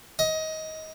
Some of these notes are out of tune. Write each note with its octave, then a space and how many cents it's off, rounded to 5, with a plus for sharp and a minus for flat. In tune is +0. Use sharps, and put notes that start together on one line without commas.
D#5 +20